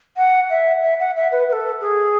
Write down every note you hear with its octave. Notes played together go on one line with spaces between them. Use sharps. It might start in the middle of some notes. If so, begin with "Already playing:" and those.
F#5
E5
E5
F#5
E5
B4
B4
A4
G#4